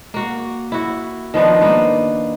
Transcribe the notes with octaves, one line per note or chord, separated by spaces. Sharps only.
A#3 F#4
E4 F#4
D#3 F3 B3 D4
A#3 B3